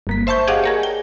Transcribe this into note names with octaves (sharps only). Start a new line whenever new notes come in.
G1 A#3 B6
C5 E5 A5 C#6 G6
G4 G#4 D5 D#5 F5 F#5
G#4 A#4 C#5
G5